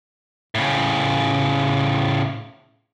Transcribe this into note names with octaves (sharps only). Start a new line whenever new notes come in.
A2 C#3